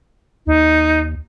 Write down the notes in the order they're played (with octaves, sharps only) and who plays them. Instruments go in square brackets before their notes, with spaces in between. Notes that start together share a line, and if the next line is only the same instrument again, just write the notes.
[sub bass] D#2 [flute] D#4